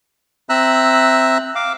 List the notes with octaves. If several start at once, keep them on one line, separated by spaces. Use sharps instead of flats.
C4 E5 A#5 E6 F#6
F5 D6